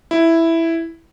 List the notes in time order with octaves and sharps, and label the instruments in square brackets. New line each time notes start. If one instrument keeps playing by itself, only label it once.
[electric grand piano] E4